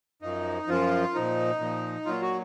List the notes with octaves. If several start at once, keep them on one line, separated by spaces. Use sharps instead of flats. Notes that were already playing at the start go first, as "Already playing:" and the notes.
F#2 F3 D#4
F#2 F3 F4
A#2 F3 D#4
A#2 F3
A#2 F#3 F4
F#4